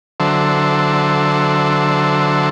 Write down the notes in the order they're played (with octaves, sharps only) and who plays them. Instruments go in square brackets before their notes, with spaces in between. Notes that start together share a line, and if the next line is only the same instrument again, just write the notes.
[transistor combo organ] D3 F#3 A4 C5 E5